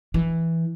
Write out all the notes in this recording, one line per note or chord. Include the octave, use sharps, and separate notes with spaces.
E3